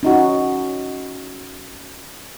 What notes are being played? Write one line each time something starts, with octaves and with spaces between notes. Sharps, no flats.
C#4 D#4 F#4